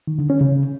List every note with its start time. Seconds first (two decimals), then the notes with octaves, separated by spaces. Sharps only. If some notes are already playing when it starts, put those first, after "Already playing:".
0.07 D#3
0.19 D3
0.30 C#4
0.41 C#3